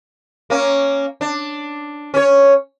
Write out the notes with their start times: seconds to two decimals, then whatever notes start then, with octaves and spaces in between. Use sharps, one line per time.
0.50 A#3 C#4
1.21 D4
2.14 C#4 C#5